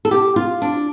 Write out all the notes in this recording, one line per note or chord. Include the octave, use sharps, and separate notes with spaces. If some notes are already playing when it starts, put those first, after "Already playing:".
A4
G4
F4
D4